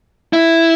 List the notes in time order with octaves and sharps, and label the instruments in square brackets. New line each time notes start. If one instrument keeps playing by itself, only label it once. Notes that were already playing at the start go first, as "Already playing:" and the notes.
[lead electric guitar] E4